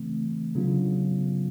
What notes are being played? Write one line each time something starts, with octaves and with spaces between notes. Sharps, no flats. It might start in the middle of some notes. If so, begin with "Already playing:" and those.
Already playing: C#3 E3 A3 C4
C#3 F#3 B3 D4 F4